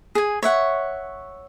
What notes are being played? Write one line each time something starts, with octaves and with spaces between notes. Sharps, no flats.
G#4 G#5
C#5 E5 F#5